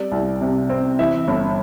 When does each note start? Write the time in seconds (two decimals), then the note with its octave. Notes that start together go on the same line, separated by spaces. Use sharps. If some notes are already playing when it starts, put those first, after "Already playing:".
Already playing: G3 C4 D5
0.12 C2
0.41 C3
0.70 C4
0.99 E3 E5
1.28 G1